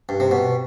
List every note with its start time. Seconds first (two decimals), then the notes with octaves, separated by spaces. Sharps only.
0.09 G2
0.20 C3
0.31 B2